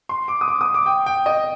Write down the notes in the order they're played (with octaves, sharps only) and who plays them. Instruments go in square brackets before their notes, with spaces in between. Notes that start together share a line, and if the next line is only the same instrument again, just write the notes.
[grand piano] C6
D6
D#6
D6
D#6
D6
G5
G5
D#5